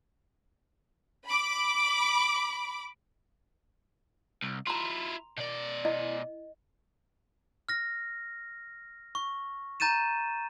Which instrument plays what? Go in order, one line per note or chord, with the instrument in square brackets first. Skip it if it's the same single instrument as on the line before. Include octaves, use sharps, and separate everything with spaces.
[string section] B5 D6
[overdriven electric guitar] C2
[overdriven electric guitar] E4 F4 [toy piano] A#5 C6
[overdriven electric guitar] B2 D5
[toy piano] E4 D#5
[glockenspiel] F6 A#6
C#6
A#5 G6 A6 D#7 E7